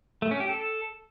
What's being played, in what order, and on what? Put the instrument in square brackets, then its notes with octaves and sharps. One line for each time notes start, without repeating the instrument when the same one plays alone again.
[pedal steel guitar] A3
C#4
G4
A4